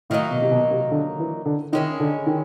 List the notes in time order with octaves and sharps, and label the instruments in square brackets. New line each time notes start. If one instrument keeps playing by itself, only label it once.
[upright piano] A2 [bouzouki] D#3 F#3 A#3 D#4
[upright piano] B2
C3
B2
C3
D3
E3
D3
[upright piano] D#3 [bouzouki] G#3 C#4 E4
[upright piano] D3
D#3